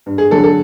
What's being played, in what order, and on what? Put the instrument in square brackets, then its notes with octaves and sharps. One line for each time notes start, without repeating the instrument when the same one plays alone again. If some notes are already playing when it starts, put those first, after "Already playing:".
[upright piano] G2
G#4
D3 F#3 A4
A4